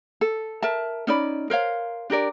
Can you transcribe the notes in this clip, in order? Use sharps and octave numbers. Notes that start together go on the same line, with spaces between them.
A4
A#4 E5 A5
C#4 D#4 D5 B5
A#4 C5 C#5 F5
D4 G4 A#4 D5